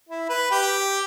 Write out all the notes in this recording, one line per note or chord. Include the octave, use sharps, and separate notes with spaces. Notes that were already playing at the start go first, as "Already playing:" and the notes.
E4
B4
G4